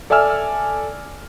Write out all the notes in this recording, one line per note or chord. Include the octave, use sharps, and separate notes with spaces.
A4 D5 E5 G#5 E6 F6